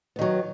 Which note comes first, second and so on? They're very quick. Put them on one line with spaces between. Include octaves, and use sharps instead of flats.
B3 D#3 F#3